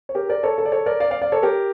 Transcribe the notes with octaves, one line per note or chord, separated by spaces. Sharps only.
C#5
G4 A#4
A#4 D5
A4 C#5
A4
D5
A4 C#5
A#4 D5
D5 F5
D5 F5
D5 F5
A4 C#5
G4 A#4